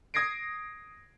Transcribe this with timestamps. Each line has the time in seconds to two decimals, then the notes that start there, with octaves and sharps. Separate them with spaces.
0.14 D#6 G#6 A#6 C7 D7